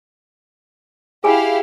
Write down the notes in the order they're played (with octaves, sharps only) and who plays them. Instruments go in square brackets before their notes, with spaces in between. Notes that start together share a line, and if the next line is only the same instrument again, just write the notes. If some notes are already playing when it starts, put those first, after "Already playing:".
[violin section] E4 G4 F5 [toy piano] G#4 G#5 B5